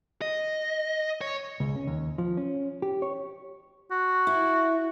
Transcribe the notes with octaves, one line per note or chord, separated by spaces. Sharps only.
D#5
C#5
C#2
C#4
D#2
F3
C#4
G4
C#5
F#4
E4